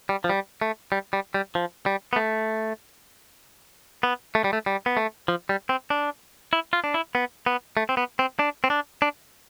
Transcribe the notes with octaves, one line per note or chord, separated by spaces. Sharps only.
G3
F3
G3
A3
G3
G3
G3
F3
G3
B3
A3
B3
A3
G3
A3
G3
B3
A3
F3
G3
C4
D4
E4
F4
D4
E4
B3
B3
A3
C4
B3
C4
D4
C4
D4
D4